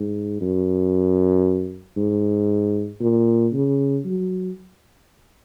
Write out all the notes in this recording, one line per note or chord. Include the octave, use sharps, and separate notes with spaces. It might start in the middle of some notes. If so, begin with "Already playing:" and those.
Already playing: G#2
F#2
G#2
A#2
C#3
F#3